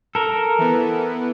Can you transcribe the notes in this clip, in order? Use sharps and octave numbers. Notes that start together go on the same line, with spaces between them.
A4 A#4
E3 B3